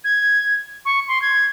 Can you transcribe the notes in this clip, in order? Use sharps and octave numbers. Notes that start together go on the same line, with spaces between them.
G#6
C#6
C6
G#6